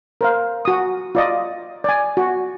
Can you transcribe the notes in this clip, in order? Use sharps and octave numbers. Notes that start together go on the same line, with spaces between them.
A#4 C5 F5
F#4 D#6
F4 D5 D#5
D5 G#5
F#4